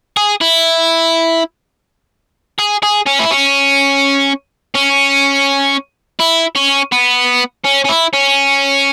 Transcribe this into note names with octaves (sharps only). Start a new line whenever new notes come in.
G#4
E4
G#4
G#4
C#4
E4
C#4
C#4
E4
C#4
B3
C#4
C#4
E4
C#4